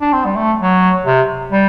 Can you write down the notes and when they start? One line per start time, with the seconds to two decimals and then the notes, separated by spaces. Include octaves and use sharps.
0.01 D4
0.13 C4
0.25 G3
0.36 A3
0.59 F#3
1.06 C3
1.52 G3